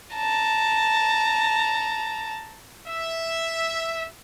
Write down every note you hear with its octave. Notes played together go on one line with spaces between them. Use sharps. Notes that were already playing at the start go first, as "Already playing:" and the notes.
A5 A#5
E5